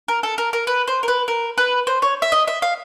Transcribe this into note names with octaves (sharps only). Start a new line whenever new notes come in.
A#4
A4
A#4
A#4
B4
C5
A#4
B4
A#4
B4
C5
C#5
E5
D#5
E5
F5